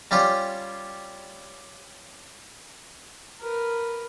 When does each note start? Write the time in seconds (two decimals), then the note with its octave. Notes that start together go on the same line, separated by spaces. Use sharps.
0.11 G3 C#4 F4 G4
3.40 A#4 B4